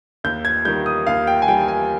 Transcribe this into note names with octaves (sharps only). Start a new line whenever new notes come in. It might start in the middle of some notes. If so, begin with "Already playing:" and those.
D#2 G6
G#6
D#3 G3 G6
D#6
D#2 F5
G5
G#5
D#3 G3 G5
G#5